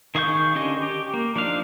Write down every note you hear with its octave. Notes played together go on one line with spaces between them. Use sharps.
D#3 G#4 F5 C#6 G6
D3 C#4 G4 D#5
G4
A#3
F3 D4 D#4 F5